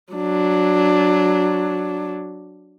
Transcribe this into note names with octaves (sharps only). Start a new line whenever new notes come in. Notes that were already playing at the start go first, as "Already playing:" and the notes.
F#3 D4